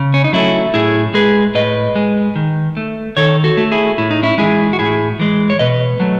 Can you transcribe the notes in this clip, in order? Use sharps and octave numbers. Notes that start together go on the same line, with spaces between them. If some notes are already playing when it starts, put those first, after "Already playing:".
Already playing: C#3
C#4
D#4
F#3 A3 C#4 E4
A2 E4 G#4
G#3 G#4 B4
A2 B4 D#5
G#3
D#3
A3
D#3 A4 C#5
F#4 A4
A3
E4 G#4
A2 E4
D#4
C#4 E4
E3 G#3 E4 G#4
F#4
A2 E4 G#4
E3 G#3
C#5
B2 B4 D#5
F#3 A3